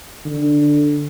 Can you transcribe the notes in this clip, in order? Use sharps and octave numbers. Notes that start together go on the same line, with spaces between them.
D3